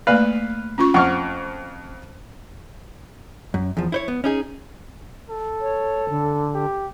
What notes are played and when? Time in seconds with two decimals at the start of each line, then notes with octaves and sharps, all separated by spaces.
0.07 A3 A#3 B4 D5 F5
0.78 C#4 F4 C#6
0.94 F2 F#5 C#6 F6
3.54 F#2
3.77 E2 F3
3.92 E4 C5 C#5
4.08 B3
4.24 C#4 D#4 G#4
5.29 A4
5.61 C#5
6.10 D3
6.54 G4